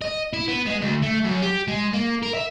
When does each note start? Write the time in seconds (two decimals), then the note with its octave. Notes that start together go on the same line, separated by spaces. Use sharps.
0.02 D#5
0.33 E4
0.48 B3
0.66 G#3
0.81 D2
1.02 A3
1.24 F#2
1.42 G4
1.68 G#3
1.94 A#3
2.23 A#4
2.34 E5